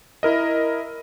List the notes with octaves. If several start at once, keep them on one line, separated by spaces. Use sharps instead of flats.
E4 A#4 D#5